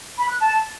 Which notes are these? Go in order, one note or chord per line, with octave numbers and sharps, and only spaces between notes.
B5
F#6
A5